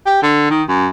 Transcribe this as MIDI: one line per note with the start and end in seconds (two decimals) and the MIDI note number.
0.06 0.22 67
0.23 0.49 50
0.50 0.63 51
0.69 0.87 42